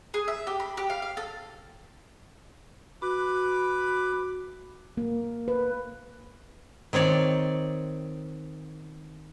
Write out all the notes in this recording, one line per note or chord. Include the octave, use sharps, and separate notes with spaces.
G#4
E5
G4
B5
G4
F5
F5
A4
F#4 B4 B5 D6
A#3
B4
D#3 C4 C#5 D5